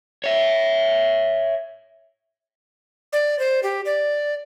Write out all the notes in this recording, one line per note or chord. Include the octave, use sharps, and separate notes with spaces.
C#5 E5
D5
C5
G4
D5